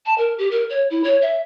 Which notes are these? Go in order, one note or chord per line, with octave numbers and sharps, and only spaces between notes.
A5
A#4
G4
A#4
C#5
E4
C#5
E5